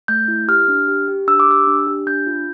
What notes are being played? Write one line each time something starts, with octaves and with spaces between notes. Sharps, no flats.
A3 G6
E4
G4 F6
D4
G4
G4
D4 E6
D6
G4 E6
D4
G4
D4 G6
F4